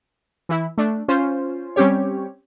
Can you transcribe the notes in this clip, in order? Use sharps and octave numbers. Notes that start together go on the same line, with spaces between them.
E3 E4
A3 D4
C#4 F4 C5
G3 C4 C#4 G4 C#5